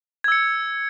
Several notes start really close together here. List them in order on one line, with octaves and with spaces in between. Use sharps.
G#6 E6 C#7